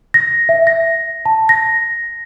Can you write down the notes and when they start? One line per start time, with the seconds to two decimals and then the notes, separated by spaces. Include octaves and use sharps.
0.14 A#6
0.49 E5
0.67 A#6
1.25 A5
1.49 A#6